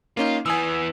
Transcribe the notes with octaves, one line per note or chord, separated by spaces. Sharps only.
A#3 C#4 D#4 F4
E3 B3 G#5 D#6 E6